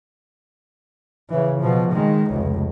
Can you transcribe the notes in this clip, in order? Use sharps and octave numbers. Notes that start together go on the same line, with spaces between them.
C#3 E3
B2 F3
D#3 G#3
F1 C#2